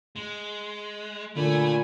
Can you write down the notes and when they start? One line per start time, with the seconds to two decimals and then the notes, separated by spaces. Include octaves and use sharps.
0.16 G#3
1.36 A#2 D3 A3 G#5 B5